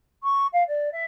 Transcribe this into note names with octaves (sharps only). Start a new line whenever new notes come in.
C#6
F5
D5
E5